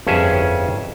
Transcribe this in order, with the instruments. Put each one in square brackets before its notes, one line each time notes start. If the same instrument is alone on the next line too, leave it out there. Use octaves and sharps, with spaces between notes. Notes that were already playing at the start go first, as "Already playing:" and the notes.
[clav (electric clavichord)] G1 F2 C#4 G#4 E5 G#5